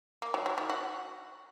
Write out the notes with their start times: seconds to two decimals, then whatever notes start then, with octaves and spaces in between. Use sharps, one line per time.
0.22 A#3
0.34 F#3
0.46 F#3
0.58 D#3
0.70 F#4